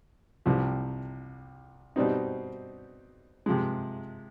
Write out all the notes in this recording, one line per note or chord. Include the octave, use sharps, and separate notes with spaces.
C2 C3 F3
B2 G3 C4 D#4
C3 F3 G#3